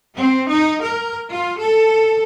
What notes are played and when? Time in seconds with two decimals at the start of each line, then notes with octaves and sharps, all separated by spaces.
0.16 C4
0.50 D#4
0.85 A#4
1.29 F4
1.59 A4